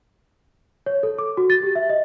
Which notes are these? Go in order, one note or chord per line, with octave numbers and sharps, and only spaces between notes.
C#5
A4
D6
F#4
A6
G4
E5
D#5